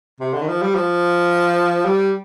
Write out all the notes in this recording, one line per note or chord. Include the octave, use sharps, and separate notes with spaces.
C3
D3
D#3
F3
G3
F3
G3